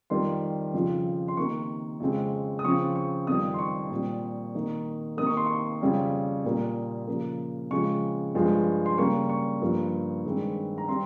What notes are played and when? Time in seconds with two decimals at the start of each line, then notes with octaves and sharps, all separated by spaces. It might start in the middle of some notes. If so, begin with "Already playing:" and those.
0.10 F2 D#3 G3 C6
0.73 F2 C#3 F3 C4
1.28 C6
1.37 C3 D#3 A#3 C#6
2.00 F2 C#3 G#3 C4
2.59 D#6
2.64 C#3 F3 C4 C#6
2.96 C#6
3.27 F2 C3 D#3 G3 D#6
3.54 C6
3.59 C#6
3.90 A#2 G3 C4
4.55 C3 D#3 A#3
5.17 C3 D#3 A#3 D#6
5.27 C#6
5.37 C6
5.46 C#6
5.81 F2 C#3 G3 C4
6.45 A#2 G3 A#3
7.07 C#3 F3 A#3
7.71 C#3 F3 G#3 C4 C#6
8.35 G2 F3 G#3
8.86 C6
8.98 C#3 G3 A#3 C#6
9.29 C#6
9.61 G2 F3 A#3
10.25 G2 D#3 G#3 C4
10.78 A#5
10.88 G3 C4 C6